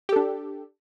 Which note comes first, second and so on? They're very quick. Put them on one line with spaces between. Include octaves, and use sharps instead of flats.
G4 A4 D4